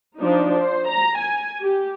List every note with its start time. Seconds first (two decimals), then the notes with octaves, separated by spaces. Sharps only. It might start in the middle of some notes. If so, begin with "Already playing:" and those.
0.19 F3 D4 D#4
0.60 C5
0.89 A#5
1.20 G#5
1.61 G4